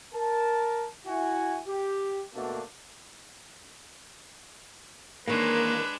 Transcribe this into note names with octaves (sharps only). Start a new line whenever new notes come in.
A#4 A5
E4 F#4 G#5
G4
B2 A3 A#3 D4
D#3 E3 G#3 A#3 C#4 D4 B4